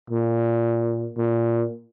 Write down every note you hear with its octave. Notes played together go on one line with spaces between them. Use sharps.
A#2
A#2